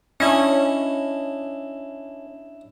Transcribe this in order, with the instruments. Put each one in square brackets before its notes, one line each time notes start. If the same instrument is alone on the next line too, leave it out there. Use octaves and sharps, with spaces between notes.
[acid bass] C#4 [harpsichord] D4 E4 D#5